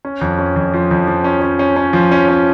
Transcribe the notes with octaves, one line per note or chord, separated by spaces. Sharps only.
C#4
F2
C#4
F2
F3
F2
F3
C#4
C#4
C#4
C#4
F3
C#4
C#4